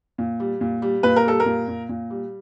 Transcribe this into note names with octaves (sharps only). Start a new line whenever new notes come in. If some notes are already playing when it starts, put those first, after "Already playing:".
A#2
G3
A#2
G3
A#2 B4
A#4
G3 A4
A#4
A#2
A#2
A#2
G3